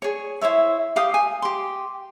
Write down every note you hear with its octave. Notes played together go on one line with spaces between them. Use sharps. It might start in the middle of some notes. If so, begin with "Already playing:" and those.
G#4 C#5
E4 C5 C#5 E5
G4 F5 G5 D#6
G#5
G4 C6